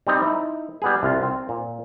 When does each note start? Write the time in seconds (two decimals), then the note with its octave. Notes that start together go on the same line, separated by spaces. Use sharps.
0.07 G3 C4 D#4 D#5
0.23 D#4 E4
0.82 G3 B3 G#4
1.03 C2 F4
1.23 C4
1.49 A#2